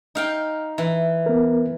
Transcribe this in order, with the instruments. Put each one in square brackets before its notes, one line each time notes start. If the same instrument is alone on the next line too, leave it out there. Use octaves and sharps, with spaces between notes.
[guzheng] D#4 F5 G5
E3
[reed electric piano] B3 A#4